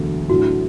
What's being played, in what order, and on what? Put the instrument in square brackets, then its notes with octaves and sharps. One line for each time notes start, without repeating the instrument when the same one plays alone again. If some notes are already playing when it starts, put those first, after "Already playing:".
Already playing: [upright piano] E1 D2 D3 F#3
[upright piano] A2 F#3 D4 [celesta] F#4